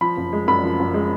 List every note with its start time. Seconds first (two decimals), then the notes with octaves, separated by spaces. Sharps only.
0.01 F3 B5
0.17 F#1
0.33 G#3
0.48 F#2 B5
0.63 F3
0.80 F#1
0.94 G#3